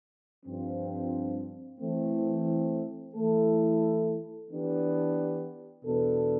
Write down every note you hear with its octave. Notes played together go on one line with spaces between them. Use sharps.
G2 F3 C4
E3 A3 C4
E3 A3 E4 A4
E3 B3 D4 G4
E2 B2 B3 D4 A4